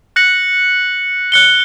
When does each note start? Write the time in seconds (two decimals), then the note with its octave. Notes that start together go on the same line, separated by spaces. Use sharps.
0.16 F#6 A#6 C#7 F#7
1.32 F#6 C#7 G7